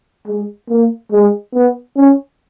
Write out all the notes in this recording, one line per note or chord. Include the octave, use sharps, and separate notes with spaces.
G#3
A#3
G#3
B3
C#4